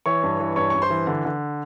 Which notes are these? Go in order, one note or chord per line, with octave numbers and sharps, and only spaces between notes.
E3 C#5 C#6
G2
E3
G2 C#5 C#6
G2 C#6
C5 C6
E3
D3
D3